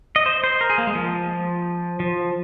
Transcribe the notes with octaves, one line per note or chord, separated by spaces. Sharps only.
D#5
C5
C5
A#4
G#4
A#3
G#3
F3
F3